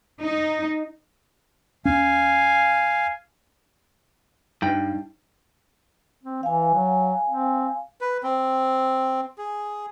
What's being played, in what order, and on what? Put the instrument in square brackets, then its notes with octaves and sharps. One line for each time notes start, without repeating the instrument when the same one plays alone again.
[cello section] D#4
[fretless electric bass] D#2 C#4 [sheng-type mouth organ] F5 G#5
[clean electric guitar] G2 [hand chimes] D#4 [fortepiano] G5
[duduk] C4
[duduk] E3 [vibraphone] F5 G#5
[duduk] F#3
C4
[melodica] B4
C4
G#4